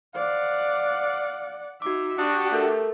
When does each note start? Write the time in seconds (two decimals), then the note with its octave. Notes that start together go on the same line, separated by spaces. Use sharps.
0.15 C5 D5 F5 F#5
1.82 D#4 F#4 E5 D6
2.18 D4 F#4 G4 D#6
2.52 A3 A4 A#4